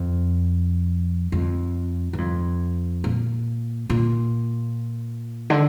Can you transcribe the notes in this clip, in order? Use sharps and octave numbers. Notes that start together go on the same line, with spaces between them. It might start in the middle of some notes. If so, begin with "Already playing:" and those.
Already playing: F2
F2
G2
F2
A#2
A#2
D3